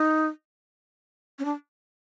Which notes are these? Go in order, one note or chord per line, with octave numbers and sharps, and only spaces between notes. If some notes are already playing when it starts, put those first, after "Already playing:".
Already playing: D#4
C#4
D4